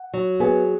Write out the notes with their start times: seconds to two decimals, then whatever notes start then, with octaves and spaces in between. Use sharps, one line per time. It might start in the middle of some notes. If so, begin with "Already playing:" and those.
Already playing: F#5
0.14 F#3
0.40 B3 G#4 G#5